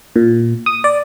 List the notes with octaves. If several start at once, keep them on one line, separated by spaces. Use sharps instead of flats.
A#2
D#6
D5